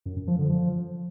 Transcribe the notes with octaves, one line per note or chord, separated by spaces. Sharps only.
F#2
F#2
F3
D3
F3